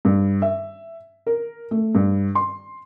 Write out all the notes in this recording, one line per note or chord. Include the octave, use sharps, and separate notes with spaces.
G2
E5
A#4
A3
G2
C6